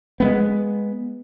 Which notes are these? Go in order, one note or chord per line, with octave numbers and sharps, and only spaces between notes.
G#3 A3 B3